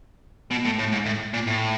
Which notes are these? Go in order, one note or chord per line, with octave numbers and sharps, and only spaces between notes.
B2
A2
A2
G#2
A2
A#2
A2